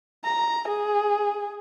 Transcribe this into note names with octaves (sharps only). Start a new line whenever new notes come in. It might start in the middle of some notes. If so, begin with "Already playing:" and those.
A#5
G#4